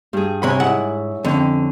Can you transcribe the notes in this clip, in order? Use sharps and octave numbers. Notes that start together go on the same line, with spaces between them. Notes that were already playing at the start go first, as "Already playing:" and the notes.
G2 G#4
C3 C#5 G#5 B5
G#2 E4 F#5
F2 D3 C4 C#4